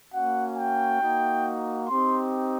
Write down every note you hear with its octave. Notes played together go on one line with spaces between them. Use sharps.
A#3 C#4 F#4 F#5
G5
A#3 D#4 F#4
C4 D#4 G4 C6